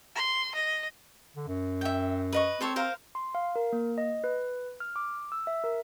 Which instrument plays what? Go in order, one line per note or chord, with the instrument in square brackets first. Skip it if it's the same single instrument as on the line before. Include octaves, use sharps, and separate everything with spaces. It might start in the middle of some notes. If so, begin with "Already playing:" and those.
[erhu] C6
D#5
[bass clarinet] D3
F#2
[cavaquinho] E5 G5
B4 D#5 C#6
[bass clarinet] C4 [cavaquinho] A4 C5 C#5
[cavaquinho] A#4 C5 F5
[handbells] C6
F5
A#4
A#3
D#5
B4
F6
D6
E6
E5
A#4